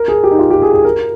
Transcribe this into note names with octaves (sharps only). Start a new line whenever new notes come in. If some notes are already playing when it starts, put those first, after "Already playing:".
Already playing: A#4
G#4
G4
D#4
F4
G4
G#4
G#4
A#4